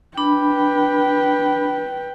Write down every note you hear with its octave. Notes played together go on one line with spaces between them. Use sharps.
D4 B4 G5 B5